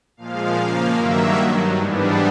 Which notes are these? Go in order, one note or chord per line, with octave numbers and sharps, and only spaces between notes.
A#2 F3 G#3 F5
C#3 F3 A#3
G2 D#3 F#3 A#3 E5
G2 D#3 F#3
G#2 E3 G3 B3 D4